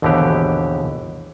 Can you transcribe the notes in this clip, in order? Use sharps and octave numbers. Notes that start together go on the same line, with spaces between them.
G#1 D#2 B2 D3 E3 G4